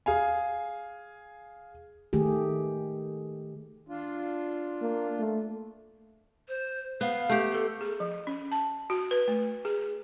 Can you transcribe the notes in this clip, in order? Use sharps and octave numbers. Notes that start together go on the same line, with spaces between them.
G#4 F5 G#5
D#3 A3 G4 G#4
D4 F4
A#3
A3
C5
B3 F5
A3 G4
A4
G#4
F3
C#4
A5
F#4
B4
A3
G#4